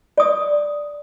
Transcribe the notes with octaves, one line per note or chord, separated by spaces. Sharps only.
D5 D#6